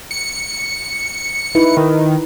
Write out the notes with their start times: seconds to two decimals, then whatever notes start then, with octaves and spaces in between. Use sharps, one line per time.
0.11 C#7
1.55 D#4 E4 B4
1.77 D#3